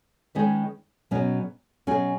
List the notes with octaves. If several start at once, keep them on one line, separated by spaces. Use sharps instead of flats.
D#3 G#3 C#4 G#4 B4
B2 F#3 C#4 G#4
B2 F#3 C#4 G#4